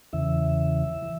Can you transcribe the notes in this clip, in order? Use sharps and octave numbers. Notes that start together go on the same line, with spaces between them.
E2 C#3 E3 E5
E3